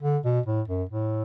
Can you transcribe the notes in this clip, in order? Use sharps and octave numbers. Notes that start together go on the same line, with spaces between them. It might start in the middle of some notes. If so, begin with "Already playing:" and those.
D3
B2
A2
F#2
A2